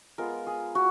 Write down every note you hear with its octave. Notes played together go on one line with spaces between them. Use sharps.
G#3 B3 F4 A#4
G#4
F#4